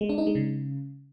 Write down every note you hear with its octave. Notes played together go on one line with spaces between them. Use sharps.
G#3
D4
D#4
G#3
C#3